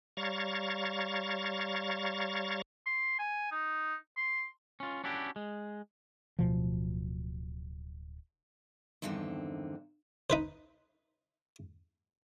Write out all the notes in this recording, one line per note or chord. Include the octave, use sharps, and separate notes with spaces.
G3 C#5 F5 A#5 C#6 A6
C6
G#5
D#4
C6
C#4 F4
C#4 D4 E4 F#4 G4
G#3
D1 B2 F3
E2 G2 D3 D#3 C4
D#4 B4 C5